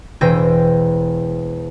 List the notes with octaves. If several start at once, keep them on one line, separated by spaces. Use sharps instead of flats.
E1 E3 C5 G5 A#6